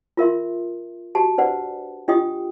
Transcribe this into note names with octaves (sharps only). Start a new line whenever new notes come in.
F4 A#4 E5 C6
F#4 G4 A5
D4 B4 C5 D5 F#5
D4 F4 G4 D#5 G5 D#6